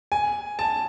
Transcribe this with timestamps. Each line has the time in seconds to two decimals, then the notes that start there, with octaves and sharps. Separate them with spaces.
0.12 G#5
0.59 A5